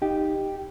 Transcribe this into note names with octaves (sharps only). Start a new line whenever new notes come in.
D#4 G4